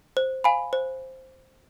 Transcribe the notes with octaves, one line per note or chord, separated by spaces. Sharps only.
C5
F5 G#5 B5
C5